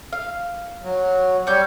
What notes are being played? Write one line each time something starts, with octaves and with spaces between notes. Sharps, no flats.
F5
F#3
G3 C#5 D6 G6